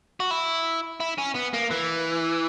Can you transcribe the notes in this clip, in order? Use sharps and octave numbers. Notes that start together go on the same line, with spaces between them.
F#4
E4
E4
C#4
B3
A#3
E3